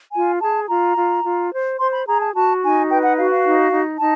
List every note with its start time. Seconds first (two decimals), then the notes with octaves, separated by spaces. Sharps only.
0.13 F4 G#5
0.41 G#4 A5
0.68 F4 A#5
0.96 F4
1.24 F4
1.51 C5
1.79 C5 C6
1.93 B5
2.06 G#4 A#5
2.20 A5
2.34 F#4 A5
2.62 D#4 G#5
2.90 B4 G5
3.03 F#5
3.17 F#4 F5
3.31 F5
3.44 D#4
3.72 D#4
3.99 D#4 A5